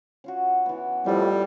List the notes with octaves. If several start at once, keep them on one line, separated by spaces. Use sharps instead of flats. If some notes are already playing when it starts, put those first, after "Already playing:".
C#4 F4 F#4
E3 B3
F2 A2 G3 F4 G4